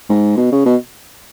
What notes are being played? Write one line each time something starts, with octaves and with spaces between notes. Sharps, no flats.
G#2
B2
C#3
B2